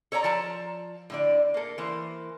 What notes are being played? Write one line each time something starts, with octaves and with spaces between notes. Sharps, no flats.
A4 C#5 D5 A5 A#5
F3 D5 A5 A#5
A2 D3 D5
A#3 A4
E3 A#3 C5